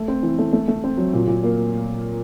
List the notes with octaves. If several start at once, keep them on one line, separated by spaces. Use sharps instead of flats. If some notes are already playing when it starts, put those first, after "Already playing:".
Already playing: A3
C4
E3
A3
A3
A3
C4
F#3
A#2
A#2
A#3